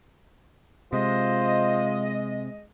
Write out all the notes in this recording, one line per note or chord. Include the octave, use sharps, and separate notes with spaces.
C3 G#3 F4 C5 D#5